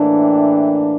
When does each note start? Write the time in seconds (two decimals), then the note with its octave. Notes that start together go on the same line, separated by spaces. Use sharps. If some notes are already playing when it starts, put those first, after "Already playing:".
Already playing: A2 E3 A#3 D4
0.17 E5 G5